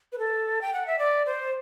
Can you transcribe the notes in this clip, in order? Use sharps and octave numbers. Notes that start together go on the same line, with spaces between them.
B4
A4
G5
F#5
E5
D5
C5